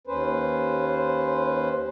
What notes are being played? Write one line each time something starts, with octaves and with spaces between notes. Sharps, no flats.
D#2 C#4 B4 C5